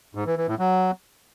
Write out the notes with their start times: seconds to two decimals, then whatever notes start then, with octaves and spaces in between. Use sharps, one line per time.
0.15 G#2
0.26 E3
0.37 E3
0.48 A2
0.59 F#3